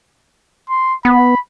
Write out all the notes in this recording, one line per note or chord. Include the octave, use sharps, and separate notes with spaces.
C6
B3 B5